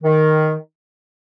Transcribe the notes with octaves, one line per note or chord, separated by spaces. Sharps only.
D#3